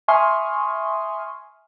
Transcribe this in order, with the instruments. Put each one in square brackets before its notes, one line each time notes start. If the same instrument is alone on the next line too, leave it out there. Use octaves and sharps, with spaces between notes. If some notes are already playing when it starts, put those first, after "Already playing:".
[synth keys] E5 G#5 C6 C#6 D#6 F6